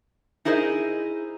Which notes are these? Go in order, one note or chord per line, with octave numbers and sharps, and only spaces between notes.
D#4 E4 G#4 A#4 C5 D#5